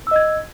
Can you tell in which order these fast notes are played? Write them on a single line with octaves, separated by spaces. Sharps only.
E6 D#5 G#6